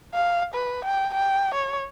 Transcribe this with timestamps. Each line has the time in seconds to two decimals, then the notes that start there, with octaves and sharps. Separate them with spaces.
0.14 F5
0.54 B4
0.85 G5
1.14 G5
1.54 C#5